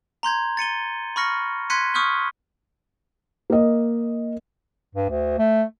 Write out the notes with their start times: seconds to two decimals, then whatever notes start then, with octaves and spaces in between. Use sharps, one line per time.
0.23 A#5 C6 G6 G#6
0.57 A6 C#7 D#7 G7
1.16 B5 C#6 F6 A#6 C#7
1.70 C6 F#6 G#6 B6 C#7 D#7
1.94 C#6 D#6 F6 G6 B6 G7
3.50 A#3 D#5
4.95 G2
5.09 D2
5.38 A3